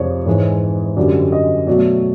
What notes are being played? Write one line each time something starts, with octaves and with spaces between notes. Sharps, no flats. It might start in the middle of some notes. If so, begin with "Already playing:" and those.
Already playing: F2 C3 F3 G#3 C#5 D5
G#2 E3 G#3 C#5
F#2 D3 G3 D5
D#5
B2 F#3 A3 D5